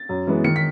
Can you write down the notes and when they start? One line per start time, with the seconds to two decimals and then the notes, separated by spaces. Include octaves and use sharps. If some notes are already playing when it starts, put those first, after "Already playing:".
Already playing: A6
0.09 F#2
0.27 E3 G#3 B3
0.44 D#3 C#7
0.56 B6